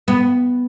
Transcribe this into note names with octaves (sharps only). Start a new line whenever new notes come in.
B3